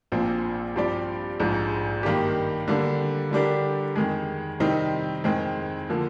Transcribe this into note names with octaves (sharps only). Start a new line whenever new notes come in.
A#1 A#2 F3 C4
G2 F3 C4 G4 D5
A#1 G#2 F3
G2 D#3 A#3 D4 G4
D3 G3 A#3 D4
D3 G3 D4 G4 A#4
F2 D#3 G#3
C3 D#3 G3 C4 D#4
F2 D#3 G#3 C4
D3 F3 A#3